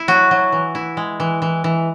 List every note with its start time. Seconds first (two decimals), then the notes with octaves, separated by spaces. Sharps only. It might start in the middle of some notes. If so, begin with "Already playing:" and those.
Already playing: E4
0.08 F#3 F#4
0.31 F#3
0.52 E3
0.75 E4
0.97 G#3
1.20 E3
1.42 E3
1.64 E3